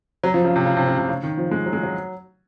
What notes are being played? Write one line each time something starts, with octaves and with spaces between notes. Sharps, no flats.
F#3
F3
C#3
C3
C#3
C3
C#3
C3
C#3
D#3
F3
G#3
F#3
G#3
F#3